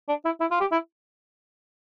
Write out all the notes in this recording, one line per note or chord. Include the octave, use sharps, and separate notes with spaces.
D4
E4
E4
F4
G4
E4